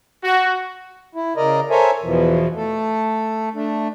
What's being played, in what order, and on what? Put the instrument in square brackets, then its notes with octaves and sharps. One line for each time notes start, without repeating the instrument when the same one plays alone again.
[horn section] F#4
[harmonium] E4
C#3 A#4 D5 D#5
A4 A#4 C5 C#5 E5 G#5
E2 B2 E3 F3
A3 A4
A3 D4